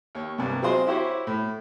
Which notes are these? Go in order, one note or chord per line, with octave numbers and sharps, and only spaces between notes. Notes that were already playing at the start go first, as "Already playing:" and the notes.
D#2 C#5
C2 G2
F#3 C4 F4 G#4 C5 D#5
E4 F#4 G4 C5 C#5
A2